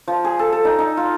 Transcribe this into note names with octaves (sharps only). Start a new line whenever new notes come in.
F3
G#4
A4
A4
D#4
D#4
F4